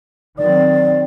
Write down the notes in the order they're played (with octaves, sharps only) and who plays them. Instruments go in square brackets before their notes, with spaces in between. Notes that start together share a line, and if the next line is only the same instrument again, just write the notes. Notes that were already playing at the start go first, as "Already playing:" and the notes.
[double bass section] D#3 F#3 C4 [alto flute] D5